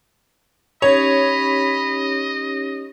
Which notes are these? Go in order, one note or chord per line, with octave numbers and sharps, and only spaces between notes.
C#4 D#4 G4 C#5 D#5 B5